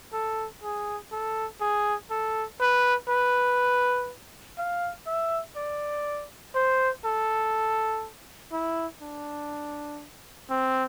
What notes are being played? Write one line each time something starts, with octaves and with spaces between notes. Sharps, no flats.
A4
G#4
A4
G#4
A4
B4
B4
F5
E5
D5
C5
A4
E4
D4
C4